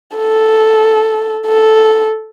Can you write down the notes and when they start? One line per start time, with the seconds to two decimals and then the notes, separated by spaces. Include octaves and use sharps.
0.17 A4
1.46 A4